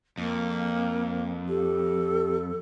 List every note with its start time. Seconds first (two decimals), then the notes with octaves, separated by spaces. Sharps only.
0.18 F2 A#3
1.49 G4 A4